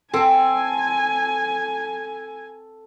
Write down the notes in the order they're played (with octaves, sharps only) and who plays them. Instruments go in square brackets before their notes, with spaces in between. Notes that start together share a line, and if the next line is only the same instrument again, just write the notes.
[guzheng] C4 [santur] A4 [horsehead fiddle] G#5